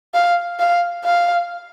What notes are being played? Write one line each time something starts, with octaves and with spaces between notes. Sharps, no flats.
F5
F5
F5